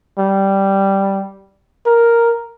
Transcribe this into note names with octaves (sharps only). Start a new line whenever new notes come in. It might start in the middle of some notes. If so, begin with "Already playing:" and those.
G3
A#4